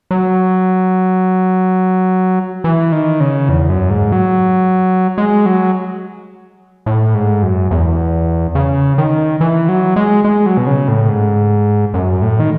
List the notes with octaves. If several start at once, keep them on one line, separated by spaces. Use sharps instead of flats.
F#3
E3
D#3
C#3
E2
F#2
G#2
F#3
G#3
F#3
A2
G#2
F#2
E2
C#3
D#3
E3
F#3
G#3
G#3
F#3
B2
C#3
A2
G#2
F#2
A2
D#3